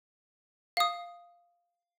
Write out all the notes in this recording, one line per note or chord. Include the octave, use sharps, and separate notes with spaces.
F5 D#6